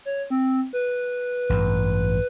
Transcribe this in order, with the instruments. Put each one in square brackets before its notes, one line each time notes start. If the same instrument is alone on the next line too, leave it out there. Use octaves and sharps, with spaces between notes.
[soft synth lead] C#5
C4
B4
[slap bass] A1 G2